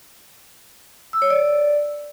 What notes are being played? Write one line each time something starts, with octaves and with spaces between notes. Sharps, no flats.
E6
C#5
D5